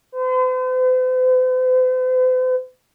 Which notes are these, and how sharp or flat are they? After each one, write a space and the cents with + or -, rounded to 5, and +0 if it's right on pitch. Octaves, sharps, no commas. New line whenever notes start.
C5 -45